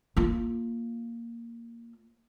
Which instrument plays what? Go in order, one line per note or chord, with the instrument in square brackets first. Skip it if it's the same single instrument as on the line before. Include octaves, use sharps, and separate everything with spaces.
[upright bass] A#3 F4